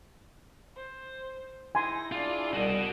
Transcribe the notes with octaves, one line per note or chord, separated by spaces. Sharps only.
C5
D#4 E4 G#5 C6 A#6
D4 F4 G#4
C2 F#4 D#5